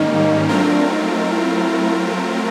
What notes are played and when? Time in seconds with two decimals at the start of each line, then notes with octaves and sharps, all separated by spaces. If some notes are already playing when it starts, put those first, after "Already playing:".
Already playing: G#2 D#3 G3 A#3 C#4 D#4
0.49 F#3 A3 C4 D4 F4 A#4
0.91 D#4
1.33 E4